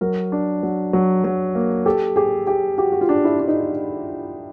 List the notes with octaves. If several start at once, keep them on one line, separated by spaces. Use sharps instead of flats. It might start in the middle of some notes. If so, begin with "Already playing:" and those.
F#3 A#4
D4
F#3
F#3
F#3
A#3
G4 A4
G4 G#4
G4 G#4
F#4 G4
F#4
F4
D4
E4
D4
D#4